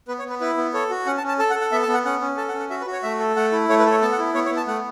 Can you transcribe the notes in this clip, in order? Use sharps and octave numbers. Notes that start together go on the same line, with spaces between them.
B3 B4
C#5
B3
B4
E4 B4
B3
A4 C#5
F#4
C#4 F#5
A5
C#4
A5
A4 A5
F#5
A4
F#5
B3 E5
A5
B3
F#5
C#4 F#5
C#4
A4 A5
F#5
C#4
F#5
F#4 E5
B4
F#4
C#5
A3 E5
A4
A3 F#5
E4
A3 C#5
B4
A4 C#5
B3 A5
F#5
E4
B3 C#5
C#5
B3
A5
A3 F#5